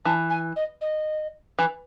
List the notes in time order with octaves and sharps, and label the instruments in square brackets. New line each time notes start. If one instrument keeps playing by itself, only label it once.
[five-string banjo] E3 [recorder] A5
[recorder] G#5
D#5
D#5
[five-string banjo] E3